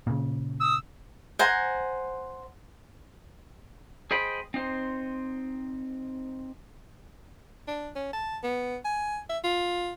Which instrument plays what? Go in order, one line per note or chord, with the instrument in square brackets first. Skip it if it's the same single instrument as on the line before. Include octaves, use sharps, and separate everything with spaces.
[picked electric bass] A#2 C#3
[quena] D#6 [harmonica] E6
[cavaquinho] C5 F#5 G#5 A#5
[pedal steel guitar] G#4 C5 D#5 G5 B5
C4 D#4 C5
[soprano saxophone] D4
C#4
A5
B3
G#5
E5
F4